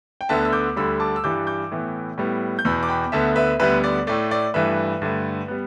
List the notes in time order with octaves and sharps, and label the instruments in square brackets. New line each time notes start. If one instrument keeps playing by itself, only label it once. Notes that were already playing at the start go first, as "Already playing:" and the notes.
[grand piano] G5
D2 D3 B3 E5 A5
E6
D6 G6
D2 D3 G3 B5 E6
A5 D6
E6
G2 E3 G3 D6 G6
D6 G6
A2 E3 B3
A2 G3 B3
G6
E2 B2 B3 B5 E6
D6
G5 B5
D2 D3 B3 E5 A5
B4 E5
D2 D3 G3 B3 B4 E5
D5
A2 A3 D5
D5
G2 E3 A3 B4 E5
G2 D3 A3
G3 B3